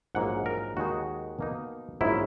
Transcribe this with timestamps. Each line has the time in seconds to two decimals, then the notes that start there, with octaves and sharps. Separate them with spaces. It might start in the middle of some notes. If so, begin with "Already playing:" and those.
0.15 A#1 G#2 F#3 A#3 F#5
0.46 A#4
0.77 D#2 D#3 G#3 D#4 F#4
1.39 B2 A#3 D#4
2.01 A#1 G#2 F#3 C#4 E4